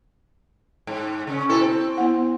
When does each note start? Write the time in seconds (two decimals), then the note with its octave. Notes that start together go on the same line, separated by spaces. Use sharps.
0.87 G#2
1.27 C#3 C#4
1.49 B2 E4 A4
1.61 C4
1.98 B3 E4 F#5